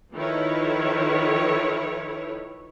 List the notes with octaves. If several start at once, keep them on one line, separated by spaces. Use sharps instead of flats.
D#3 F3 E4 A4 B4 C#5